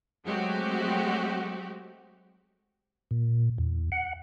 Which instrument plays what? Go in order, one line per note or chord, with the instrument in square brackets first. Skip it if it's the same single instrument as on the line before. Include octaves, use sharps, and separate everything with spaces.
[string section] F#3 G#3 A3 C4 F#4 G4
[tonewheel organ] A#2
E2
F#5